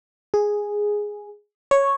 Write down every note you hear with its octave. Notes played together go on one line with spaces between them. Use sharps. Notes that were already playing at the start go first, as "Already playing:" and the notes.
G#4
C#5